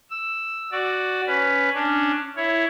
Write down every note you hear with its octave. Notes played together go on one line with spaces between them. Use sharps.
E6
F#4 D5
C#4 B4
C#4 D4
E4 C#5